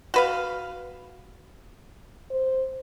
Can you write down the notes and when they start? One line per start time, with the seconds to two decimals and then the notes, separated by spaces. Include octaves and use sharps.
0.14 F#4 B4 F5
2.31 C5